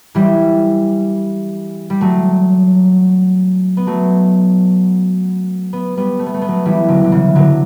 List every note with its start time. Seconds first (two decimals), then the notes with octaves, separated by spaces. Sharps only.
0.15 E3 G3
1.90 G3
2.01 F#3 A3
3.77 B3
3.87 F#3 A3
5.73 B3
5.97 G3 B3
6.19 A3
6.26 B3
6.34 A3
6.41 B3
6.49 F#3 A3
6.65 E3 G3
6.89 D3 F#3
7.04 D3
7.12 C#3 E3
7.35 D3 F#3